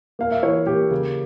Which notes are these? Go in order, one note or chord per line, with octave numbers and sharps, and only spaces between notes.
A#3 F5
E5
E3 C#5
A#3 G4
C#3